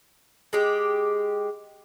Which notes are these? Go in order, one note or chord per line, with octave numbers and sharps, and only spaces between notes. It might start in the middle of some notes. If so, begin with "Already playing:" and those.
G#3 G4